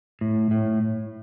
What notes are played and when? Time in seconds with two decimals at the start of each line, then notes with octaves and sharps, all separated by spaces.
0.21 A2
0.51 A2